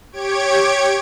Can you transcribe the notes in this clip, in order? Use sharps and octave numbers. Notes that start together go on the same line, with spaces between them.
G4 C#5 G#6 D7